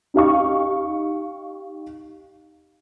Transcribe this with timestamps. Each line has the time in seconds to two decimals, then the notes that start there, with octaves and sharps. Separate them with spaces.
0.14 D#4 G4 F5 C#6